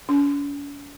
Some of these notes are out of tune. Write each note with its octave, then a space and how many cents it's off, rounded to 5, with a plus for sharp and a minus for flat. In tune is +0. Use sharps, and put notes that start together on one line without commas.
C#4 +45